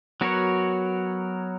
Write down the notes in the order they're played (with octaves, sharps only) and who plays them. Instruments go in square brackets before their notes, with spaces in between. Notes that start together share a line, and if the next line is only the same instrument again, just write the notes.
[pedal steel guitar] F#3 B3 F#4 A#4 C#5